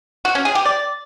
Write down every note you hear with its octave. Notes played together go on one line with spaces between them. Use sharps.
F#4
C#4
G#4
G4
D5